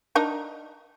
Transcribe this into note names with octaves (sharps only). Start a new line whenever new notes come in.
D4 D#4 A#4